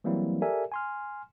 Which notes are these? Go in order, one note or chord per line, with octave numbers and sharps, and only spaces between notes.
E3 F#3 G3 A#3 C4 E4
G4 A4 A#4 D5 E5 G#5
G#5 C6 F6